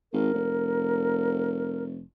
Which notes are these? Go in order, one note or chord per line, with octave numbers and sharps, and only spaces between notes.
G#1 A#4
F1